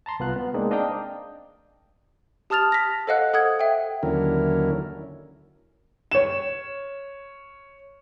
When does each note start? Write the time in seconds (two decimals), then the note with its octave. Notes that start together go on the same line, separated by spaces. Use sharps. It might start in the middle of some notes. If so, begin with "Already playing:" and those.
0.06 A5 A#5 C6
0.20 C2 B3 F4 F#6
0.36 B3
0.54 G#3 A#3 C4 D4 D#4
0.71 D4 D#5 F5 G5 A#5
2.50 G4 A5 D#6 F6 A6 F7
2.72 A#6 B6
3.07 A4 C5 D#5 F5 F#5 F#6
3.33 A4 F#5 D#6 G#6
3.59 E5 G5
4.03 D#2 D3 F#3 C#4 E4 A#4
6.11 C#5 E7